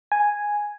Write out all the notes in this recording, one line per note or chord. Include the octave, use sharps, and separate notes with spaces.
G#5